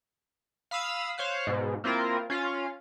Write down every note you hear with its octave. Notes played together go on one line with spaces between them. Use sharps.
F5 B5 D#6 E6
C5 C#5 F5 F#6
G#2 B2
A#3 C4 E4 F4 A#4
C#4 F4 F5